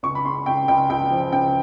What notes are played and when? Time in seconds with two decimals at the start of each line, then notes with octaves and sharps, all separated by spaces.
0.03 C#2 C#6
0.15 B5
0.25 C#3 C6
0.46 C#2 G5
0.68 C#2 G5
0.89 C#2 G5
1.11 F3
1.32 C#3 G5